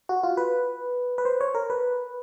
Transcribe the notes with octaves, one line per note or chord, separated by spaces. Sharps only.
F#4
F4
B4
B4
C5
C#5
A#4
B4